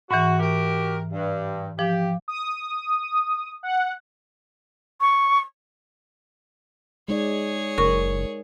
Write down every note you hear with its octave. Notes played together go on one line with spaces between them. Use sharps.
G#2 E3 F#4
F#4 G4 A#4
G2
F3 G4
D#6
F#5
C#6
G#3 D#4 G#4 C#5 D5
F#1 A#4 C#6